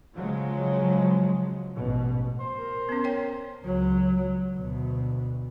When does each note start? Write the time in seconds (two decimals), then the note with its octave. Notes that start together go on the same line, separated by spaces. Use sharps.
0.15 C#3 F3 F#3 G#3
1.75 A1 G#2 B2
2.40 C5
2.57 A#4
2.89 B3 C#4
3.04 C#5 G5
3.65 C#2 F#3
4.56 D2 B2